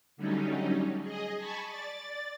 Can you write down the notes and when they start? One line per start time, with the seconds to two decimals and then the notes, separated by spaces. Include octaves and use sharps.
0.17 D3 F#3 G3 A3 C#4 D#4
1.02 G#4 D#5
1.36 G#5 A5 B5 C#6
1.68 D5 A6